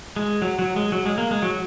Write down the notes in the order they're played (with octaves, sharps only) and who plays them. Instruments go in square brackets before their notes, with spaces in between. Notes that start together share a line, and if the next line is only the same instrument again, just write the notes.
[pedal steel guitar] G#3
F#3
F#3
G#3
F#3
G#3
A#3
G#3
F#3